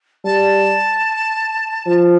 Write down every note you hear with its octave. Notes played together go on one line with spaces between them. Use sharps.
G3 A5
F3